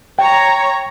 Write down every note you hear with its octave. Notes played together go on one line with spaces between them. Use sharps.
C#5 G5 A#5